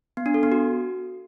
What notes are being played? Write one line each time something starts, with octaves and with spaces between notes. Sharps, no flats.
B3
D4
A4
B3
F#4